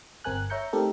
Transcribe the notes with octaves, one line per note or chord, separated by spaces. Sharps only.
G1 C4 A#4 G#5 F#6
C#5 E5 A#5 G6 C#7
A3 C4 D#4 G4 A4 A#4